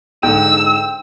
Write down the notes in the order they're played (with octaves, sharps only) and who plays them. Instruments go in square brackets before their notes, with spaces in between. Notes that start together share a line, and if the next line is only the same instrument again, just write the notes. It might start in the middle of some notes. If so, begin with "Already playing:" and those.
[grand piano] G#2 D3 [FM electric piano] G5 [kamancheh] E6